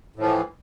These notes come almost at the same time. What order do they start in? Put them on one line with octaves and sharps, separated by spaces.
A2 F3 E3